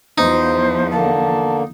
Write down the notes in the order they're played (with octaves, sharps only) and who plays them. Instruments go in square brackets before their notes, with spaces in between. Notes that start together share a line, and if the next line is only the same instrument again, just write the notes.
[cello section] E2 F3 [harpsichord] D#4 [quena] C5
[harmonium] D3 A#3 [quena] A5